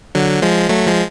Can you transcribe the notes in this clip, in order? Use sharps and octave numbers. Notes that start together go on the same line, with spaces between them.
D3 F#3
F3 G#3
F#3 A3
F3 G#3